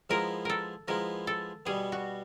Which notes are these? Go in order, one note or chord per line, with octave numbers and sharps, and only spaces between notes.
F3 G#3 B3 E4 A#4
A4 A#4
F3 G#3 B3 E4 A#4
A4
B2 G3 B3 G#4
F#4